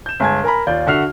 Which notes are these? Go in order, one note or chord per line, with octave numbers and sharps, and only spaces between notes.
G6 E7
G1 G#3 G#5 A5 G#6
A#4 G#5 A#5 B5
D#2 F4 D5 G6
D3 F#4 E5 F6 C7 F7